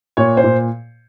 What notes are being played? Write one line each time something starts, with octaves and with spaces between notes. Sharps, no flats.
A#2 C#5
C5
A#2